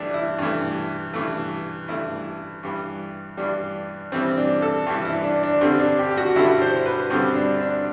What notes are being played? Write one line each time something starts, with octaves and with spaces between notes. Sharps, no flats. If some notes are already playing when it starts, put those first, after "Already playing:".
Already playing: G2 E3 A3 D4
E4
G2 E3 A3
G2 E3 A3
G2 E3 A3 E4
G2 E3 G3
G2 E3 G3 D4
G2 E3 G3 C4
D4
A4
G2 E3 G3 G4
E4
D4
D4
G2 D3 G3 C4
D4
G4
G4
F#4
G2 D3 G3 E4
C5
B4
G2 D3 G3 C4
D4
D4